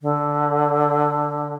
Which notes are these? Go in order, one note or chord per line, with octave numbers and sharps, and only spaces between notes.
D3